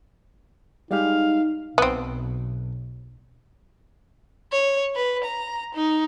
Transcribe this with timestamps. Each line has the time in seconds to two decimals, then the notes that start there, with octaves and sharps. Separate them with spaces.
0.91 G3 G#3 D#4 G4 F5
1.78 B1 B3 C4
4.52 C#5
4.96 B4
5.24 A#5
5.75 D#4